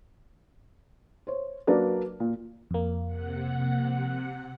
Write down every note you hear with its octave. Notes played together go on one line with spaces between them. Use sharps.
C5 C#5
F#3 A#3 D4 A#4 B4 D5
A#2
F2 A#3
C3 F#5